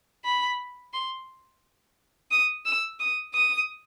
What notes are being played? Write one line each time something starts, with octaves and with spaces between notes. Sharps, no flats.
B5
C6
D#6
E6
D#6
D#6